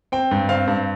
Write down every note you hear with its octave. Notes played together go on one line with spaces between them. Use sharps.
C4 G5
G2
C4 F5
G2